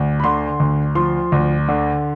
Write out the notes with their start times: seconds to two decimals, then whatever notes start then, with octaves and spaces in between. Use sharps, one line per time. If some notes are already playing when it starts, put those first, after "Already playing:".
Already playing: D2
0.20 B5
0.24 D3 C6
0.60 D2
0.95 F3 C6
1.32 D2
1.69 D3